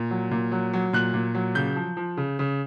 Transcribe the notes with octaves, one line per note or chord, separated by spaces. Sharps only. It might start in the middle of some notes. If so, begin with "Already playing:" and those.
Already playing: A#2
F#3
A#2
F#3
F#3
A#2 F#6
A#2
F#3
C#3 G6
F3
F3
C#3
C#3